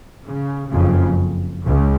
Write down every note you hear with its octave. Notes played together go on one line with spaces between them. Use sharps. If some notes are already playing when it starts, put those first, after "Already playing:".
C#3
F#1 F2 C#3
C#2 C#3